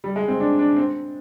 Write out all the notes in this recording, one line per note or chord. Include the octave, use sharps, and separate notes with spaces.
G3
G#3
C4
D4
D4
C4